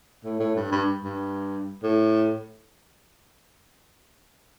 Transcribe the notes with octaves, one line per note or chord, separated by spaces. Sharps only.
A2
A2
G2
G2
G2
A2